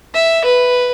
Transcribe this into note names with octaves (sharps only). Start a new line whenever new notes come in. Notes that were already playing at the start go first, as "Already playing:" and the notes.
E5
B4